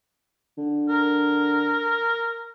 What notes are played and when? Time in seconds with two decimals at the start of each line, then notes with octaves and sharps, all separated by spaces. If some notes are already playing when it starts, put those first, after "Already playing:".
0.58 D3
0.89 A#4